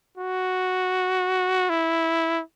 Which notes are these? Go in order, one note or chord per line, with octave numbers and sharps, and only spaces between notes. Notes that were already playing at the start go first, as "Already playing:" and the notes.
F#4
E4